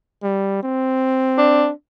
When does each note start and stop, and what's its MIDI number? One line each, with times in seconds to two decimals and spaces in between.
0.23 0.59 55
0.63 1.71 60
1.38 1.69 62